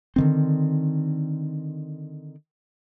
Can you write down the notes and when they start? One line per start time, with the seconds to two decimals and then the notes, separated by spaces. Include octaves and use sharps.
0.16 D3 D#3 C4